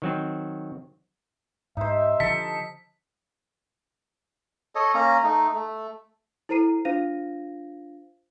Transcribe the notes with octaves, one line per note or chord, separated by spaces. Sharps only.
D#3 F#3 C4
G#2 D#4 C5 E5
D3 E3 F3 A4 B6
A4 C#5 D#5
A#3 C#4 A#5
A3 D#4
A3
E4 A4 C5 A#5 C7 D#7
D4 F4 C5 F5 A#6 D#7